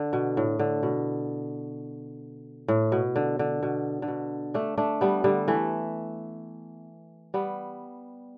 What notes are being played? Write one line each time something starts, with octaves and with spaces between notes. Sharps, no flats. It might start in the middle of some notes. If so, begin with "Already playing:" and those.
Already playing: D3
B2
A2
D3
B2
A2
B2
D3
D3
B2
D3
B2
A3 D4
A3 D4
G3 B3
D3 G3
E3 A3
G3 B3